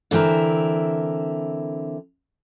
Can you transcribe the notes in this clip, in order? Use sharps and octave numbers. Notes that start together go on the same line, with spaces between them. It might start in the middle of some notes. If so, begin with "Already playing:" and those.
D3 E3 C4 E4 A#4